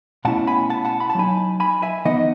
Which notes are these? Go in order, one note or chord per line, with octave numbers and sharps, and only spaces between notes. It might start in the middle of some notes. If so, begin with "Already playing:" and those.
B2 A3 C#4 E4 F#5 A5
G#5 B5
F#5 A5
F#5 A5
B5
A5
F#3 A3 D#4 G#5 B5
G#5 B5
E5 G#5
E3 B3 D#4 D#5 F#5